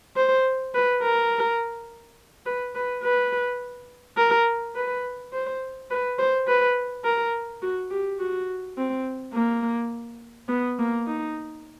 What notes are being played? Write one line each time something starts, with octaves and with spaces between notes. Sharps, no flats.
C5
B4
A#4
B4
B4
B4
A#4
B4
C5
B4
C5
B4
A#4
F#4
G4
F#4
C4
A#3
B3
A#3
D#4